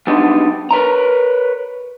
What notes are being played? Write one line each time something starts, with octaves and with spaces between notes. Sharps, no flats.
F#3 G3 B3 C4 D4 D#4
A#4 B4 C#5 A#5